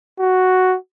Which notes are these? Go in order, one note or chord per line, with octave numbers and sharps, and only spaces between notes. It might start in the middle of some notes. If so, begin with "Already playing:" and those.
F#4